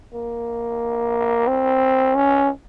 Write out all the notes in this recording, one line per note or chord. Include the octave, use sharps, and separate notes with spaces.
A#3
C4
C#4